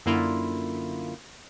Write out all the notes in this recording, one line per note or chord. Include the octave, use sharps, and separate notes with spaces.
F#2 D3 A#3 E4 F4